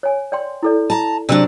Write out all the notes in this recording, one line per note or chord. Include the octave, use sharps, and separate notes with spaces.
C#5 G#5
D5 G5 C6
E4 A4 D5
A5 A#5
C3 F#3 D4 D5 E6